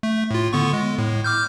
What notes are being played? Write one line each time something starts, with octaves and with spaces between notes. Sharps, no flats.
A3
A2 F4
D3 B3 C#6
G#3
A2
D6 F6 G6